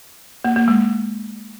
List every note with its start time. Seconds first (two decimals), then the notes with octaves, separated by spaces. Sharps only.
0.44 A#3
0.56 A#3
0.68 G#3